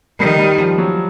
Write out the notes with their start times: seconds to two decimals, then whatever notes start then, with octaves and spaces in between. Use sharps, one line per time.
0.19 D#3 G3
0.39 G3
0.59 F3
0.78 F#3